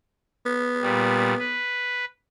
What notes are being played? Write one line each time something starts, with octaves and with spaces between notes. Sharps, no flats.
B3
A#2 G3
B4